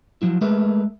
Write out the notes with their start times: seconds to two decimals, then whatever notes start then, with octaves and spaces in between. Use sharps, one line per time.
0.22 F3 F#3 E4
0.41 G#3 A3 G#4 A#4 B4 E5